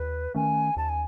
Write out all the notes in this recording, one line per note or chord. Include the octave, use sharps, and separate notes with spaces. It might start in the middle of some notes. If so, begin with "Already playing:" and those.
Already playing: D#2 B4
D#3 A3 C#4 G#5
D#2 A5
G#5